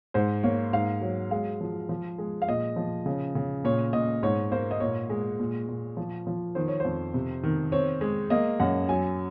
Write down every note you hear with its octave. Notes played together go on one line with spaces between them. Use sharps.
G#2 C5
A#3 C#5
G#2 F5
F#3
G#3 F5
F3
F3
G#3
F5
A#2 D#5
F3
C#3
C#3
A#2 C#5
A#2 D#5
G#2 C#5
A#3 C5
D#5
A#2 C#5
G#3
A#2
A#2
F3
F3
D#3 C5
C#5
F2 C5
C3
D#3
C4 C#5
G#3
A#3 D#5
F#2 F#5
F#3 G#5